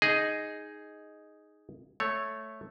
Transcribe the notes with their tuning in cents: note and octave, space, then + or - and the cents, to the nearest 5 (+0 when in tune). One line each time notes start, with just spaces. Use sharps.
D#4 +0 G#4 +0 D#5 +0
A3 +0 C#5 +0